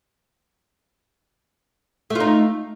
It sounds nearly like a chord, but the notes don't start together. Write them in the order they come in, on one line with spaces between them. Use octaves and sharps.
A3 F4 D#4